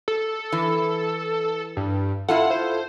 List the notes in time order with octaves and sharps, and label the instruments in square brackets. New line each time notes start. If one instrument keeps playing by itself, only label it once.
[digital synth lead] A4
[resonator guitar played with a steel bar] E3
[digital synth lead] G2
[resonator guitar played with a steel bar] E4 F4 A4 [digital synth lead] F#5
[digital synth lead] C5